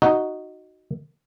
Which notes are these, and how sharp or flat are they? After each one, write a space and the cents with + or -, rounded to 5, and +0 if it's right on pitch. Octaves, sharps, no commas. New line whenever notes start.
D#4 +0 F#4 +0